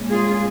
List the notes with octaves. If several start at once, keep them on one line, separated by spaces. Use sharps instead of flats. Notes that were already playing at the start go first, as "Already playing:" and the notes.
Already playing: A#2 G#3 C#4
F4 G#4